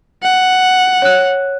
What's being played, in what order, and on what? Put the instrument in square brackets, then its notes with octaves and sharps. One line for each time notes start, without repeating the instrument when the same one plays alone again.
[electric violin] F#5
[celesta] C#5 F#6